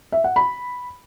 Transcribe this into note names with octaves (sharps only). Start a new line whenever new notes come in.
E5
F#5
B5